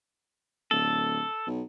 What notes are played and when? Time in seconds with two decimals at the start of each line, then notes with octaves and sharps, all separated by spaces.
0.71 D1 A4
1.47 B1